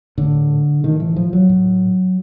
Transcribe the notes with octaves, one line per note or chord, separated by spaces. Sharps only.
A2 D3
A2 D#3
E3
F3
F#3
A2